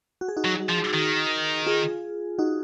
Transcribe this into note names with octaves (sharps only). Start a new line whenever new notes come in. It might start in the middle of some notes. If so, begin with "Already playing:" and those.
F#4
G#4
D#4 F#4
F#3
F3
D#3
F4 G#4
D#4 F#4